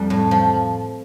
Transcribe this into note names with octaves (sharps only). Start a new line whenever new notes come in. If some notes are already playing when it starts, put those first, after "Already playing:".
Already playing: F2 G3
A2
F3